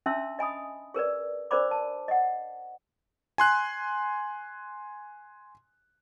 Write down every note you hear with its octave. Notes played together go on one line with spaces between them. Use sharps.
C#4 D4 E5 A5 C6 E6
D#5 G#5 B5 D#6
G#4 A#4 B4 D5
D4 A#4 C5 D5 B5 D6
A5
D#5 F#5
G#5 C6 F#6